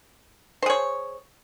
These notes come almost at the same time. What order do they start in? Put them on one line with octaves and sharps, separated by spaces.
C5 G#4 C#5